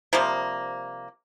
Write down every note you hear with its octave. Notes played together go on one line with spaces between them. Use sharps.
C3 F3 G3 A#3